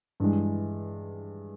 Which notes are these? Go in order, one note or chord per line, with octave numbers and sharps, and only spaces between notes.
G2 E3 G#3